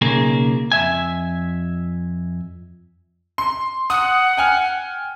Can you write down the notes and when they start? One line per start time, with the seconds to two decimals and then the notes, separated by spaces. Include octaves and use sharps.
0.01 B1 C#3 A#3 G#4 G#5
0.72 F2 E5 G#5
3.38 C6
3.90 F#5 D#6
4.37 G5 G#5 F6